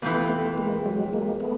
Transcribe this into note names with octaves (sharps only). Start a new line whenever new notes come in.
F2 C3 E3 A3 B3
A3 B3
G#3 A#3
F#3 G#3
G#3 A#3
A3 B3